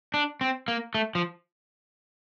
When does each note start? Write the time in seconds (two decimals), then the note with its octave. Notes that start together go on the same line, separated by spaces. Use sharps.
0.14 D4
0.41 C4
0.68 A#3
0.95 A3
1.15 F3